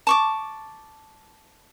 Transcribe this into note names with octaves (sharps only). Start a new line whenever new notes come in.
A5 C#6 D6